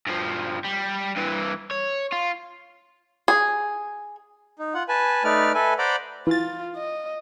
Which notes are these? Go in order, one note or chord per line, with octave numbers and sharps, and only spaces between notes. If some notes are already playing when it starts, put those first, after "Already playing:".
G2 F3
G3
G2 E3
C#5
F4
G#4
D#4
F4 F#5
B4 G#5 A5
A3 D#4 B4 D5 F6
A4 B4 E5 G#5
C5 D5 F#5 A#5 B5 D6
E3 F4 A6
D#5